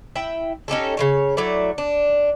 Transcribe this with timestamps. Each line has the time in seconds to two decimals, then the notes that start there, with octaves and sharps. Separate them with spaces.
0.15 E4 E5 G5
0.68 C#4 D#4 G4 A4
0.97 C#3 F3 C#5
1.37 F#3 A3 E4 D5
1.78 D4